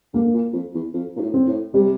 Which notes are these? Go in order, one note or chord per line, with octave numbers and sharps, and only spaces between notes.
D3 A#3
A#2
F2
E2
F2
A#2
A2
C4
A2
C3 G3